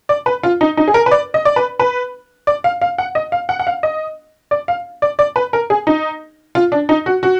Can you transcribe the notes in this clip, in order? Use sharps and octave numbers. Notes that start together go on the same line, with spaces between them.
D5
B4
F4
D#4
D#4
G#4
A#4
B4
D5
D#5
D5
B4
B4
D5
F5
F5
F#5
D#5
F5
F#5
F#5
F5
D#5
D5
F5
D5
D5
B4
A#4
G#4
D#4
F4
D4
D#4
F#4
F#4